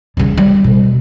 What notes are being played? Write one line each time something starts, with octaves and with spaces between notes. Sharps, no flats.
C#3 G3
G3
B2